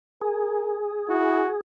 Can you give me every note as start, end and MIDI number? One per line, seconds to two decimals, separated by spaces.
0.21 1.61 68
0.21 0.78 70
1.09 1.44 64
1.09 1.52 66